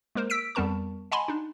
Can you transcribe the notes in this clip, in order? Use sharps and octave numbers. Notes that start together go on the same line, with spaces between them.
G#3 A#3 A#4 C5
E6 B6 D7
F2 G3 B3 A#4 A5 C#6
D#5 F#5 G#5 A5 B5 C6
D4 D#4